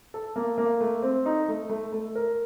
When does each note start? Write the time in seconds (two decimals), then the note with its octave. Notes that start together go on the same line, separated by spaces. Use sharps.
0.14 A4
0.36 A#3
0.58 A#3
0.81 A3
1.02 C4
1.26 D#4
1.48 A3
1.70 A3
1.92 A3
2.15 A#4